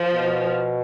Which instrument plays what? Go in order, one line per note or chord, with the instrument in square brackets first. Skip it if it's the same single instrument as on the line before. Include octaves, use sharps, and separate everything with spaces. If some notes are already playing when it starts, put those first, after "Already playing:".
Already playing: [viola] F3
[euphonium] B2